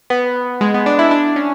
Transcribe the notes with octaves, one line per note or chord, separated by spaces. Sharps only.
B3
G#3
B3
D4
E4
D4
C#4